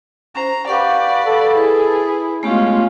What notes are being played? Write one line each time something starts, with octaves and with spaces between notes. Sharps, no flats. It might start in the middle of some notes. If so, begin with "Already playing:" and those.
C#4 C5 A#5
G4 B4 D5 F5 F#5 C#6
A4
E4 G#4 B4 B5
G#3 A3 B3 C#4 F4 G4